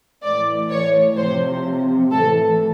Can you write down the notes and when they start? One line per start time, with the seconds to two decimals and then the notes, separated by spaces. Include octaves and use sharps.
0.23 A2 E3 D5
0.70 C#5
1.17 C3 F3 C5
2.12 A2 E3 A4